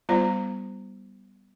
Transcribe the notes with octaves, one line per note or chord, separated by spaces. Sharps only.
G3 B3 F4 C5 D5 A#5